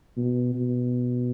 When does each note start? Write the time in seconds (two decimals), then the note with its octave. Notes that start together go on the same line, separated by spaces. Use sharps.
0.17 B2
0.55 B2